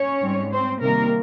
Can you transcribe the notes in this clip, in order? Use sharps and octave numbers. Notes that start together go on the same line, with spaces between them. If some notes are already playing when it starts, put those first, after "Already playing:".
Already playing: C#4 C#5
G#2 G3 C4
C4 C5
C3 D#3 G3 A#3 C4 A#4